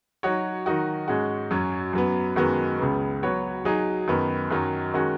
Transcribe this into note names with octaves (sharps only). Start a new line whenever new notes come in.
F#3 D#4 F#4 C#5
D#3 F#3 D#4 F#4
G#2 G#3 C#4 F#4
F#2 F#3 C#4
F#2 F#3 B3
F#2 D#3 G#3 B3 F#4
C#2 C#3 B3
F#3 B3 F#4 C#5
F#3 D#4 G#4
F#2 D#3 B3
F#2 D#3 F#3 D#4
D#3 G#3 C#4 F#4